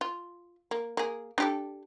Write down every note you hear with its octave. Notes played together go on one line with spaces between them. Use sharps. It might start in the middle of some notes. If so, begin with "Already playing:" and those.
F4
A#3
A#3 G#4
D4 G4 A4